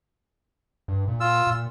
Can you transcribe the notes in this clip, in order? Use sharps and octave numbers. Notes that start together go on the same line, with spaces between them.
G2
A#2
F4 E6
A#2